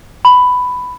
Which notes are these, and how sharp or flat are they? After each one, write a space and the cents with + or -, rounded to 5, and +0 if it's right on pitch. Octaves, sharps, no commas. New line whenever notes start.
B5 +10